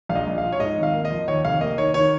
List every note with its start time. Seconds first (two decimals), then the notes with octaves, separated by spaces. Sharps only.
0.09 A#1 F5
0.15 D#5
0.27 A#1
0.38 F5
0.44 F3
0.53 C#5
0.60 G#2 D#5
0.78 G#1
0.83 F5
0.94 A#3
1.05 D#5
1.10 F3
1.28 D#2 C#5
1.44 F1 F5
1.60 A#3 D#5
1.77 D#3 C#5
1.94 D#3 C#5